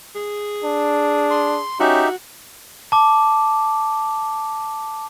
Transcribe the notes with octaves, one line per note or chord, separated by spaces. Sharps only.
G#4
D4
C6
C#4 D#4 F#4 G4 E5
A5 D6